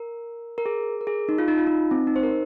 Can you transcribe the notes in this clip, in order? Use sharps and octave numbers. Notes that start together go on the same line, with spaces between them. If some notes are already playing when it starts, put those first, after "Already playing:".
Already playing: A#4
A#4
G#4
A#4
G#4
D#4
F4
D#4
F4
D#4
C4
D#4
C5
A#4